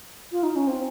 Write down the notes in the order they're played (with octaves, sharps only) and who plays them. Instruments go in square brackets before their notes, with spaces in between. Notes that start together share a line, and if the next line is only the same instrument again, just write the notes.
[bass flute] F4
D#4
C#4
C4